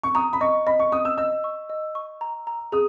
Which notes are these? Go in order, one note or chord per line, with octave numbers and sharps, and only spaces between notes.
C#6
A#5 D#6
B5
D#5 C#6
D#5 B5
C#6
D#5 D#6
E6
D#5 E6
C#6
D#5
C#6
A#5
A#5
G#4 D#6